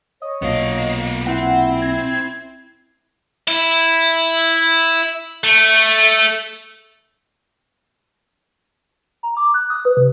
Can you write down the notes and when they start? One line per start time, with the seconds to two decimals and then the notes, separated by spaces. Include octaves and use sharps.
0.22 C#5 D#5
0.42 B1 A#2 B3 F5
1.27 C4 E4 F#5
1.82 G#6
3.48 E4
5.44 A3
9.23 A#5
9.37 D6
9.54 F#6
9.70 D#6
9.85 B4
9.97 C3